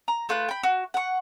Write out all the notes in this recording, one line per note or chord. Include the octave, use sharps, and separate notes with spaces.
A#5
A3 F4 B4 F#6
G5 B5
F#4
F#5 C#6